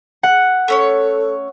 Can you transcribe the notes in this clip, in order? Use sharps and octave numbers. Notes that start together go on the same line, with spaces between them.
F#5
A3 C#4 A4 C#5